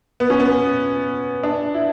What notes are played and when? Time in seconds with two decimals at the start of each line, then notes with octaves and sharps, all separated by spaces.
0.20 B3
0.30 C#4
0.40 B3
1.43 D4
1.75 E4